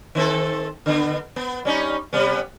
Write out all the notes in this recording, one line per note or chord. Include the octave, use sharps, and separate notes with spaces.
D#3 C4 A4
D3 B3
B3
G3 C#4 D#4
C3 G3 B3